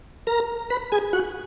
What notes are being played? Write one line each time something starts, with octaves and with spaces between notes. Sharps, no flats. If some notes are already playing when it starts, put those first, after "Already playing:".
A#4 A#5
B4 B5
G#4 G#5
F#4 F#5